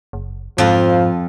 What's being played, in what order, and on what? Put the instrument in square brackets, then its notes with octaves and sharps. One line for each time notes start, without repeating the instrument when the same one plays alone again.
[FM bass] F#1
[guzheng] F2 F4 [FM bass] G#2 [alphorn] F3